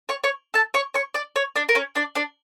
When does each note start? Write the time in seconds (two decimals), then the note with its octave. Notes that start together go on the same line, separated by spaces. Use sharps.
0.09 C#5 C#6
0.24 C#5 C#6
0.54 A4 A5
0.74 C#5 C#6
0.94 C#5 C#6
1.14 D5 D6
1.36 C#5 C#6
1.56 D4 D5
1.69 A#4
1.75 C#4 C#5
1.95 D4 D5
2.15 D4 D5